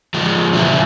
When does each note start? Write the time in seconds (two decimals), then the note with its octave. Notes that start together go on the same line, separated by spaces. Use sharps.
0.14 F3 G#3
0.53 E2 A#2 C#3 F#3 E4